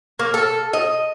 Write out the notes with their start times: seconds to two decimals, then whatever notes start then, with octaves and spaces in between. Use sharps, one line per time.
0.19 A#3
0.34 A4
0.73 D#5